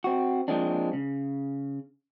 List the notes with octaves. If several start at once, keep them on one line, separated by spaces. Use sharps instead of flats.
C4 F#4
F3 G#3 A#3 C4 D4
C#3